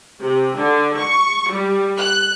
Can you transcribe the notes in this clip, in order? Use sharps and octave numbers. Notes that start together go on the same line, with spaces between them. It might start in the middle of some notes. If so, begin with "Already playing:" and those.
C3
D3
C#6
G3
F#6